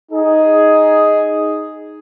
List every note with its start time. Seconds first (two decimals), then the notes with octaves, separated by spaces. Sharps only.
0.11 D#4 G#4